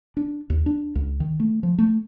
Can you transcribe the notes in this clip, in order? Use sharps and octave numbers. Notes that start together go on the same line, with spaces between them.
D4
D#2
D4
C#2
D#3
A3
F3
A3